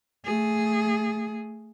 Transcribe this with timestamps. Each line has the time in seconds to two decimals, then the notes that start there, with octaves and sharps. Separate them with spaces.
0.25 A3 G#4